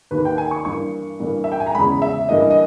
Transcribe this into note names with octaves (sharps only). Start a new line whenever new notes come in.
D#2 D#3 A#3 B4
G5
G#5
C#6
G2 E3 A#3 C#6
G2 E3 A#3
E5
G5
G#5
A#5
E2 C#3 G#3 B5
E5
G2 E3 A#3 D#5
D#5